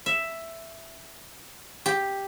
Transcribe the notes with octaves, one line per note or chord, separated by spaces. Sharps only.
E5
G4